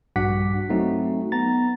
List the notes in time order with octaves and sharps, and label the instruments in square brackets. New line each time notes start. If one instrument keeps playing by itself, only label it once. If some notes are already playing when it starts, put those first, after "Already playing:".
[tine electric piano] A#1 G2 F#4 F#5 D6 B6
F#3 A3 C4 D#4 F#4
B3 A#5 A6